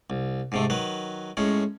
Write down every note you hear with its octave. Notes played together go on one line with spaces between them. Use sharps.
C2
G#2 C3 A3
D#3 F#3 B4
A2 G#3 C#4